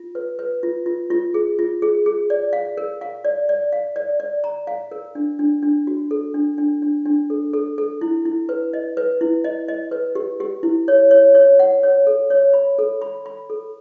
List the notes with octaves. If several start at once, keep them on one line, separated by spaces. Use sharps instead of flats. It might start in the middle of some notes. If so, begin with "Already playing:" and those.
Already playing: F4
B4
B4
F4
F4
F4
G#4
F4
G#4
G#4
D5
F5
A#4
F5
D5
D5
F5
D5
D5
A#5
F5
A#4
D4
D4
D4
F#4
A4
D4
D4
D4
D4
A4
A4
A4
E4
E4
B4
D#5
B4
E4
D#5
D#5
B4
G4
G4
E4
C#5
C#5
C#5
F#5
C#5
A4
C#5
B5
A4
B5
B5
A4